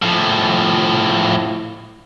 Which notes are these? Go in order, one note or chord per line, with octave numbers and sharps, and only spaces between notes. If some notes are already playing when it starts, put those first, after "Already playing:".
A2 F3